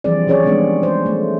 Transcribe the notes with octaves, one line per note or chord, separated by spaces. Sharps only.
E3 F3 G3 C4 G#4 D5
F#3 C#4 G#4 C#5 D5
G3 G#3 B3 C4 D4 D#4
C5
A3